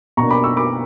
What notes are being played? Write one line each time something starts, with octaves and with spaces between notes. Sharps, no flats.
B2 A#3 D4 A#5 C#6
B5 D6
C#6 E6
B5 D6